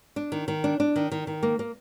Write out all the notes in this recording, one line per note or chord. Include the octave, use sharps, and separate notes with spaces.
D4
D#3
D#3
D4
D4
D#3
D#3
D#3
A#3
A#3